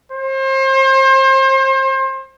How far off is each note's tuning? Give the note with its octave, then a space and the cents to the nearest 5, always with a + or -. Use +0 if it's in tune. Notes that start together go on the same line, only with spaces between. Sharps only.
C5 +35